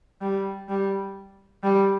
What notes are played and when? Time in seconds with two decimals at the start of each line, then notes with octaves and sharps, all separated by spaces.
0.21 G3
0.69 G3
1.63 G3